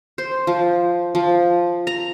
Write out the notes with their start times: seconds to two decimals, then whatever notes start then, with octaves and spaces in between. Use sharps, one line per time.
0.18 C5
0.47 F3
1.15 F3
1.87 A#5